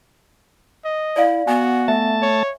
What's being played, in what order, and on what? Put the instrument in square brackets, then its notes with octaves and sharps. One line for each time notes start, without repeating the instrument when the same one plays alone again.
[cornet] D#5
[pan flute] E4 [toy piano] D5 F5
[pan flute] B3 [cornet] F#4 [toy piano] G#5
[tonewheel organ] A3 A5 [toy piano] E5
[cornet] C#5